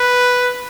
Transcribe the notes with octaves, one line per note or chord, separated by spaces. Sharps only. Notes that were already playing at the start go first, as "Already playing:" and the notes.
Already playing: B4